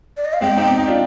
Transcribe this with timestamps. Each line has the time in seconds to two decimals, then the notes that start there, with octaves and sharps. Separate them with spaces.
0.17 D5
0.25 D#5
0.33 F5
0.41 G#3 C4 G5
0.57 C4 D#4
0.78 D#4
0.87 D4 F4